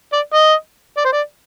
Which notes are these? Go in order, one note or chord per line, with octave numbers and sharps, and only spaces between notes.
D5
D#5
D5
C5
D5